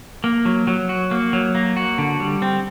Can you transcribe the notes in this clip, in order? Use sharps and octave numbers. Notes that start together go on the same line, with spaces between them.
A#3
F#3
F#3
F#4
A#3
F#3
A#3
F#4
D3
G3
C4